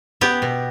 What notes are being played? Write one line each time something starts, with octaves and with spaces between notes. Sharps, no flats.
B3 G4
B2